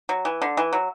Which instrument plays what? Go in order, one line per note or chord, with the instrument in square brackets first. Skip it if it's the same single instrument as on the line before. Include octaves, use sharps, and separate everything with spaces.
[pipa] F#3
E3
D3
E3
F#3